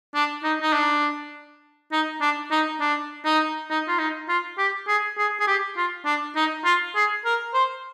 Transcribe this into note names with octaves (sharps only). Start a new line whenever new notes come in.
D4
D#4
D#4
D4
D#4
D4
D#4
D4
D#4
D#4
F4
D#4
F4
G4
G#4
G#4
G#4
G4
F4
D4
D#4
F4
G#4
A#4
C5